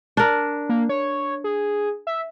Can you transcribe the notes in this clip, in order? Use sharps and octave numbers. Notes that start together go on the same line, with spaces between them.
D4 A#4
A#3
C#5
G#4
E5